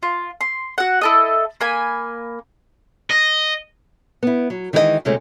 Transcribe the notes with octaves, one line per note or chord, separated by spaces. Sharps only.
F4
C6
F#4 F#5
E4 A4 D#5
A#3 G#5 B5
D#5
B3 E4
F#3
D#3 E3 G#3 E4 G4 D#5
D2 C3 G#3 A3 C#4